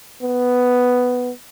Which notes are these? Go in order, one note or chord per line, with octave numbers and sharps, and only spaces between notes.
B3